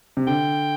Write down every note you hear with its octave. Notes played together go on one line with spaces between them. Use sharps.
C3
D3 G5